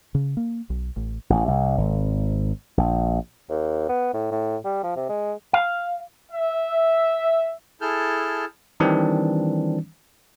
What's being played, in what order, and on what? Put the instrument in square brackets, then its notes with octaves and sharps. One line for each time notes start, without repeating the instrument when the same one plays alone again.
[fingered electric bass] C#3
A#3
B1
A1
[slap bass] A1
C2
G#1
A#1
[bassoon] D#2
B3
A2
A2
G3
F3
C3
G#3
[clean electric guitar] F5
[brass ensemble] E5
[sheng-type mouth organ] E4 G#4 A4 A5 F6 G6
[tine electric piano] D#3 E3 G3 C4 D4